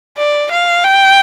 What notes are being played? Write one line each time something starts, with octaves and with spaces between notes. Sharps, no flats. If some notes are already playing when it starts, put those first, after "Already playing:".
D5
F5
G5